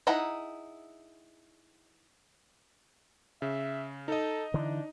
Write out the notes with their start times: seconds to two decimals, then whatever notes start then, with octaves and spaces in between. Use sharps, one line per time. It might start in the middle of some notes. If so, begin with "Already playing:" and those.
0.07 D#4 E4 G#4 F#5 A#5
3.42 C#3 E5
4.08 D#4 A4 D#5
4.54 D3 E3 D4